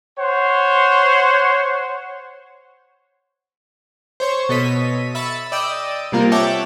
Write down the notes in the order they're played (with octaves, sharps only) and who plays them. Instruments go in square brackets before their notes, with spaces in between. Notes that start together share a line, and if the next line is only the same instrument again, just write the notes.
[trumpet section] C5 C#5 F#5
[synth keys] C5 C#5 C#6
B2 A4 C#5 D#5 B6 D#7
E5 B5 A6 C#7 D#7
D5 D#5 G5 D#6 E6 D7
C3 G3 A#3 F4 A#4
C#5 E5 F#5 G5 A5 D6